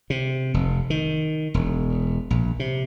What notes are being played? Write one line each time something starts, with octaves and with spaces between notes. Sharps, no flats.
C3
F1
D#3
E1
A#1
C3